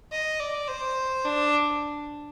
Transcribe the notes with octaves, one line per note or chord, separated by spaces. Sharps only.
D#5
D5
C5
D4